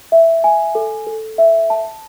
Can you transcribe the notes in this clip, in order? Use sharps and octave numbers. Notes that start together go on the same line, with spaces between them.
E5
G#5
A4
A4
E5
A5